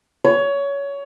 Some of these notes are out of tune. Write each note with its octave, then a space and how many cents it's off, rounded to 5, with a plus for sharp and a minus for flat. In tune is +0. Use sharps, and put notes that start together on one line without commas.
C#5 +20